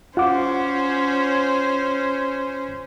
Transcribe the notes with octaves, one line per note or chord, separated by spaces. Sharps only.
C#4 F4 C5 F#5 D6